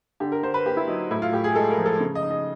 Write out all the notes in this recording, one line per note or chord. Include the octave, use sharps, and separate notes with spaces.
D3 G4
A#4
D3 C5
B4
A#3 G4
E4
F#3 D#4
A2 E4
F4
A2 G4
G#4
G#3 A4
A#4
F3
A4
C#3
D#5
D#4
D#5